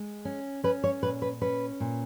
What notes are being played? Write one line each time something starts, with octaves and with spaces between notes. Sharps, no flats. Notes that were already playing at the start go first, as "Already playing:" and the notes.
Already playing: G#3
C#4
C#4 B4
C#5
A#2 B4
B4
C#4 B4
A#2